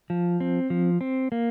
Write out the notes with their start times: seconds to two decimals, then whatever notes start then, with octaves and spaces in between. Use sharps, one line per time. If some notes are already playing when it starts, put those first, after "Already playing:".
0.10 F3
0.40 C4
0.70 F3
1.01 C4
1.32 A#3